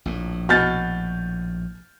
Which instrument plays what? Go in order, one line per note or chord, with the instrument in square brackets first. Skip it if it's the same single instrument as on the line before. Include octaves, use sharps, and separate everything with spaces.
[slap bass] A#1 A2
[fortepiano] B2 F#4 [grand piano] F6 G6 A6